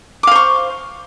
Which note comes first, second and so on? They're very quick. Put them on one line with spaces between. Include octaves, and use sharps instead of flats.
D6 F5 C5 C#6